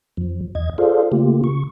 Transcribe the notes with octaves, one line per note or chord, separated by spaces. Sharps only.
F2 F3
E2 D#5 G#6
F4 G#4 A4 C5 D5 F5
C#3 A3 A#3 F4 G4
C#3 C#6